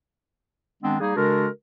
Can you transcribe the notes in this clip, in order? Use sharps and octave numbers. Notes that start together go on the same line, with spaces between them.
D#3 G#3 B3 C4 D4
G3 A#3 D#4 G#4
C#3 G#3 D4 F#4 A4 A#4